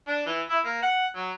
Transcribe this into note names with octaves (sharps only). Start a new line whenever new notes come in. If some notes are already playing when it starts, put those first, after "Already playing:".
D4
E3
E4
A#3
F#5
F#3